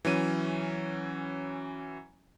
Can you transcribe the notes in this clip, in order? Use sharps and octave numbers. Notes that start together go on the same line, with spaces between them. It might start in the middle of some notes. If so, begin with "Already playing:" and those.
E3 F#3 C#4 D#7